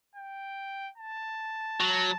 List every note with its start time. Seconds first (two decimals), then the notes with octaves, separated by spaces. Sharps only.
0.15 G5
0.98 A5
1.81 F#3